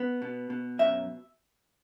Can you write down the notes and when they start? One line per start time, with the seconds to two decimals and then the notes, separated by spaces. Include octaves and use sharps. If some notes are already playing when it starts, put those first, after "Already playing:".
Already playing: B3
0.22 B2
0.50 B2
0.79 F#2 E5